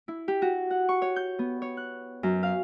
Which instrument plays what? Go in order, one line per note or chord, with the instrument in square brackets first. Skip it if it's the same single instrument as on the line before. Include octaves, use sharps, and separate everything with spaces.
[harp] E4
G4
F#4
F#5
C#6
C#5
G6
B3
C#5
F#6
F#2
F5